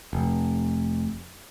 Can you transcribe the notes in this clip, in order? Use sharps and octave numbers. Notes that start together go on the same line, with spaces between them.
F1